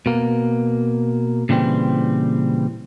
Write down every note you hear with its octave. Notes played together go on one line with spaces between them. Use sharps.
B2 A#3
A#2 C#3 E3 G3 C4